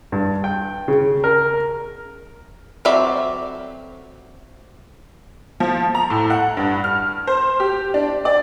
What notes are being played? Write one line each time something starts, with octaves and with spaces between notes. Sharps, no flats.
G2
G5
C#3
A#4
F#3 C4 A4 D5 E5
F3
A#5
A2
F#5
G2
F6
C5
G4
D4
D5